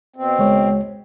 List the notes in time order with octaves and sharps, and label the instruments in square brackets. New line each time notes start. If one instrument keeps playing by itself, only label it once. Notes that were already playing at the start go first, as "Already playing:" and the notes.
[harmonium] B2 C4
[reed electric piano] C#2 G#3 C#5